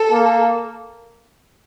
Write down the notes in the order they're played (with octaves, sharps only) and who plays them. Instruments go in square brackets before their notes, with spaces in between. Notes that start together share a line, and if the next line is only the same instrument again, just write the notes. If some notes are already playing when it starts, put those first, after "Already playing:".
Already playing: [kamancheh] A4
[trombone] A#3